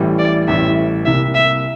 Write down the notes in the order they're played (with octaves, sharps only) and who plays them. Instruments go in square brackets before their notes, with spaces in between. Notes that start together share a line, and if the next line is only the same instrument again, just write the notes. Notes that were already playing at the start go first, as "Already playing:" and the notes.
Already playing: [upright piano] A1 A2 E3 G3
[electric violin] D5
[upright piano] A1 A2 E3 G3 [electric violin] E5
[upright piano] C2 C3 G3 A#3 E4 [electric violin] E5
[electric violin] E5